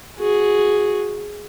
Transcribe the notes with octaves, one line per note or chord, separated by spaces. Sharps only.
F#4 G#4